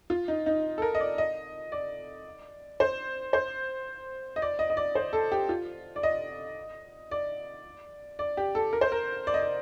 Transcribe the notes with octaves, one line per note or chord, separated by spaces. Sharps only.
F4
D#4
D#4
A4
A#4
D#5
D5
D#5
D5
C5
C5
D#5
D5
D#5
D#5
D5
C5
A4
G4
F4
D5
D#5
D5
D5
G4
A4
A#4
C5
A#4
D5
D#5
D5